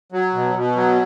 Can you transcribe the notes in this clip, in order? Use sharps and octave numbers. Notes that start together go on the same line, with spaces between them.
F#3
B2
B2
F#3